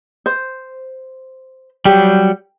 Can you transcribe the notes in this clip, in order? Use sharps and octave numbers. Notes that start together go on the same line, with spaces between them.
C5
F#3 G3 G4